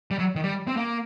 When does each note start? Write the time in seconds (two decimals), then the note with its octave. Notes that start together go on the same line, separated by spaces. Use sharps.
0.11 G3
0.19 F#3
0.36 D#3
0.43 G3
0.67 C4
0.77 A#3